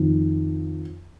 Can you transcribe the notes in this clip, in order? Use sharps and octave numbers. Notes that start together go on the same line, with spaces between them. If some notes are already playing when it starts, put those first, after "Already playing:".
Already playing: F2 D#3